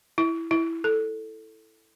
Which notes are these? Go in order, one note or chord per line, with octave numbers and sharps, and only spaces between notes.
E4
E4
A4